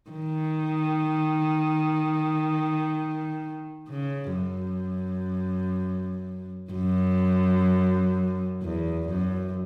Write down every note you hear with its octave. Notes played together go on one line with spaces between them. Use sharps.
D#3
C#3
F#2
F#2
E2
F#2